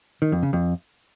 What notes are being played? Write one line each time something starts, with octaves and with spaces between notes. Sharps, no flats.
D#3
F2
C#3
F2